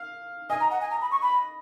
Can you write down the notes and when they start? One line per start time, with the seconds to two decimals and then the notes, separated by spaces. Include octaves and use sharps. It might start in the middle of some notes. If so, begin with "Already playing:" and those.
Already playing: F5
0.50 D#5 G#5
0.60 A#5
0.70 F#5
0.81 G#5
0.91 A#5
1.01 B5
1.11 C#6
1.22 B5